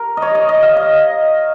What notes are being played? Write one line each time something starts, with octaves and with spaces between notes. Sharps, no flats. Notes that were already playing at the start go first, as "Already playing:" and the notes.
Already playing: A#4
D#5
C#5
D#5
D#5
F5
D#5